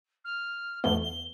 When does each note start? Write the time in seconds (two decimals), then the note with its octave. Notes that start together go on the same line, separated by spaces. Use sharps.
0.25 F6
0.84 E2 A3 B3 G7
1.03 G7